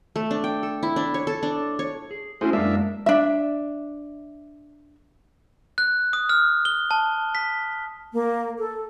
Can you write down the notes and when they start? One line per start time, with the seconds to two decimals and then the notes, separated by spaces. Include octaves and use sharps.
0.16 A3
0.31 D4
0.44 G5
0.63 A4
0.83 E4
0.96 D4
1.14 C#5
1.27 A4
1.43 D4
1.79 C#5
2.11 G#4
2.41 A3 C#4 E4 F#4 G#4 C5
2.53 F#2 G#3 A#3 D4 E5
3.06 D4 E5
5.78 F#6
6.13 D#6
6.29 F6
6.65 G7
6.91 A5
7.35 B6
8.14 A#3
8.59 A4